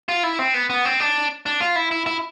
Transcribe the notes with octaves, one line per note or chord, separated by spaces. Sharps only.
F4
E4
C4
B3
B3
C4
D4
D4
F4
E4
E4
E4